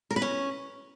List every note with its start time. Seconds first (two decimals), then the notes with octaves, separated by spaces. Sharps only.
0.11 A#4
0.16 B4
0.22 C#4